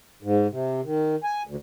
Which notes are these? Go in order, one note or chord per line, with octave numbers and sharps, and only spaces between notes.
G#2
C3
D#3
G#5
D2